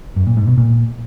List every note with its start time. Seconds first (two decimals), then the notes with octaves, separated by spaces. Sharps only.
0.16 F#2
0.27 A#2
0.37 G#2
0.47 B2
0.58 A#2